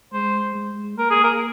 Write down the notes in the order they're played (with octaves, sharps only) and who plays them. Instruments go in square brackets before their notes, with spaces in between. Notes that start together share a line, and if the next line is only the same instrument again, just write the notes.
[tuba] G#3 [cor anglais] C5
[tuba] G#3
[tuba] A#3 [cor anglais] A#4
[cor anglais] G#4
A#4